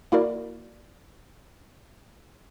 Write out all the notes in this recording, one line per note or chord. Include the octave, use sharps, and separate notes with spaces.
A#3 E4 F#4 A#4 D5